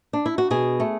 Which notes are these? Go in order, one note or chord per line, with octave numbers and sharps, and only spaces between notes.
D4
E4
F#4
B2 G#4
A3